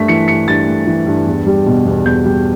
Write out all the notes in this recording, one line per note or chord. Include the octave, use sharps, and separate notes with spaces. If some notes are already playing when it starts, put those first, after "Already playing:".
Already playing: G2 A3 B6
E3 C#7
G2 C#7
G2 A6
A3
E3
G2
E2
G3
B2
E2
E2 G6
G3